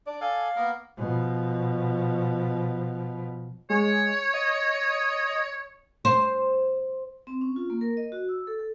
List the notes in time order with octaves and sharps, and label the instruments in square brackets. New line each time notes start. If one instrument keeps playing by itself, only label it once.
[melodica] D4 [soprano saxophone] D5
[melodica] A4 D5 G#5 [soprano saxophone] F5
[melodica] A#3 B3 A#4
[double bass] B2 F3
[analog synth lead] G#3 [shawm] C#5
[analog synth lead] D#5
[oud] C5
[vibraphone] C4
C#4
F4
A#3
A#4
D#5
F#4
E6
A4
A4